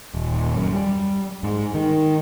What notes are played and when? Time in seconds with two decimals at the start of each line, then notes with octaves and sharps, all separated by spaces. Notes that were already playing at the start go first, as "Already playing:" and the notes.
0.14 D#1
0.55 F#2
0.73 G3
1.43 G#2
1.74 D#3